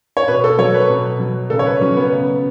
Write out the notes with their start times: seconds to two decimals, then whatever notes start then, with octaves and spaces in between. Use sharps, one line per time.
0.17 C#5
0.28 B2 B4
0.44 A4
0.58 F#3 C#5
0.74 B4
0.90 B2
1.20 F#3
1.50 C#3 A4
1.59 C#5
1.66 B4
1.81 F#3 C#4
1.97 B3
2.12 C#3